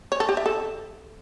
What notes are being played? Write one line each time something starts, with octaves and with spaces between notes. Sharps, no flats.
C#5
A4
G4
E5
A4